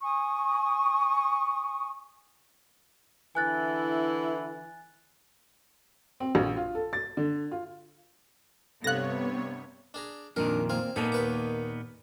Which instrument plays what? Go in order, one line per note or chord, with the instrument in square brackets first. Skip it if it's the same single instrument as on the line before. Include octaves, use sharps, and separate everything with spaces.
[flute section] G#5 C#6 D#6
[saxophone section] D3 E3 E4 [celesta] G#5 F#6 A6
[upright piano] C4
A#1
F4
A4
A6
D3
F4
[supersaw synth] G2 C3 C#5 [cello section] B3 [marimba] A4 F5 [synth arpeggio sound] F#6 A#6
[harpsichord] D4 G#4 A#5
[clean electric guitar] F2 A#2 D#3 [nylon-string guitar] D4 D#5 [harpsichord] A#4
[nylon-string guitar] A#3 D5 [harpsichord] C4 F5 G#5
[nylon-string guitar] A#2 A5 [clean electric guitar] A#3 B3 D#4 [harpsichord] A4
[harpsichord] D#2 B4 D6